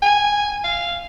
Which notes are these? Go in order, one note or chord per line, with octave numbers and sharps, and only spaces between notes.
G#5
F5